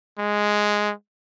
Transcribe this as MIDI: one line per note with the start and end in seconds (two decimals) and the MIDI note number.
0.19 0.93 56